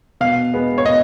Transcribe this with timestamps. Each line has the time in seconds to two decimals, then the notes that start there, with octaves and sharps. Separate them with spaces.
0.21 B2 F5
0.53 G#3 B3
0.78 C#5
0.86 B2 D#5